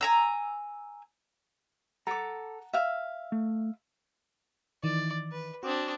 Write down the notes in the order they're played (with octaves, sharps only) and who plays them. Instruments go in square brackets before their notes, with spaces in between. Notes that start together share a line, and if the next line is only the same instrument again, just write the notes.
[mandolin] G#5 A#5 E6
[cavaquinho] A4 D6 [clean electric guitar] F#5 A#5
[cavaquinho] E5 F5
[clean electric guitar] A3
[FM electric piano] D#3 E3 [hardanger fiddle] D5
[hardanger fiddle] B4
[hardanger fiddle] C4 D4 [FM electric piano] F#4 D6 D#6